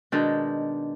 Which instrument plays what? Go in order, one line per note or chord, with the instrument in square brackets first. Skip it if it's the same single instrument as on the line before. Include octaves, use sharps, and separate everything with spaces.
[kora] B2 D#3 G#3 [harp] D4 G6